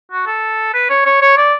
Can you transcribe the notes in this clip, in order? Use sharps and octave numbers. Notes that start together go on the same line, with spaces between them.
F#4
A4
B4
C#5
C#5
C#5
D5